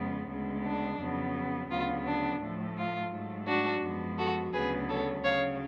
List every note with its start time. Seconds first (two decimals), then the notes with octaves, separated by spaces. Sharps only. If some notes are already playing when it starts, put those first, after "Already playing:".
Already playing: F2 C#3 G#3 B3
0.30 D2 C#3 G#3 B3
0.65 D4
1.00 F2 C#3 F#3 B3
1.71 D2 C#3 F#3 B3 F4
2.06 D4
2.41 A2 F3 A3
2.77 F4
3.12 G#2 F#3 A3
3.47 D4 F#4
3.83 F#2 F3 G#3 B3
4.18 F#4 A4
4.53 D2 C#3 F#3 B3 G#4 B4
4.88 A4 C#5
5.23 D2 C#3 F#3 C#5 F5